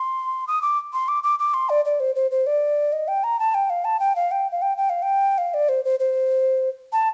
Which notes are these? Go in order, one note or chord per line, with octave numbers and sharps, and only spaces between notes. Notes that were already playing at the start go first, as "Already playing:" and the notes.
Already playing: C6
D#6
D6
C6
D6
D6
D6
C6
D5
D5
C5
C5
C5
D5
D#5
G5
A#5
A5
G5
F5
A5
G5
F5
G5
F5
G5
G5
F5
G5
F5
D5
C5
C5
C5
A5